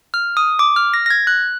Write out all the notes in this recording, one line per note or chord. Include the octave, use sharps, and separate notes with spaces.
F6
D#6
D6
F6
A#6
A#6
G#6
F#6